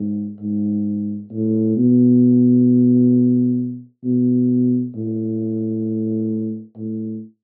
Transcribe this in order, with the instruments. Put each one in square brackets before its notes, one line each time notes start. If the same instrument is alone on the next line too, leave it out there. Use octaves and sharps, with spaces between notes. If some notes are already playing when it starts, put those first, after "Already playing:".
Already playing: [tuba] G#2
G#2
A2
B2
B2
A2
A2